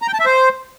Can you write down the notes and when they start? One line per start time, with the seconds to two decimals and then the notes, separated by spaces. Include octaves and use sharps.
0.02 A#5
0.08 G5
0.14 A5
0.20 E5
0.25 C5